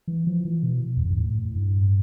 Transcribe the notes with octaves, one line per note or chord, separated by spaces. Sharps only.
E3
F3
E3
B2
E2
F2
G2
A2
G2